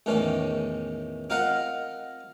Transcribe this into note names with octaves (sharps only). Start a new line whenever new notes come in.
E2 A2 D#3 E3 C#4 D5
C4 F4 A#4 D#5 F5 F#5